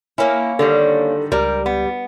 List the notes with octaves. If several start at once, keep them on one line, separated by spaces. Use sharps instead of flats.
A#3 C#4 E4
D3 D#3 G3 A4
C#2 G3 A#4 D5
B3